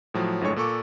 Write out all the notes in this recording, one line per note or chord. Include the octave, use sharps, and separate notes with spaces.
A2 F3 F#3
G1 A2 D3 G#3 C#5 C#6
A#2 A4 C#6 D6